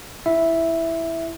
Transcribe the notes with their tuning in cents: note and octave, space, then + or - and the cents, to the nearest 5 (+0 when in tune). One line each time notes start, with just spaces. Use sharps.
E4 +0 E5 +0